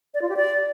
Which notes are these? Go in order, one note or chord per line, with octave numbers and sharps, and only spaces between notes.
D5
F4
G4
D5